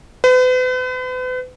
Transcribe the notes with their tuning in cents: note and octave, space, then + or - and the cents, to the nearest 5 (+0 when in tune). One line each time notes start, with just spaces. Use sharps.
B4 +40